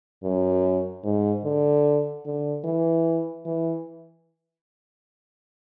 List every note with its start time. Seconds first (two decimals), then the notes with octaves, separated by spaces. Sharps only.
0.24 F#2
1.04 G#2
1.44 D3
2.25 D3
2.65 E3
3.46 E3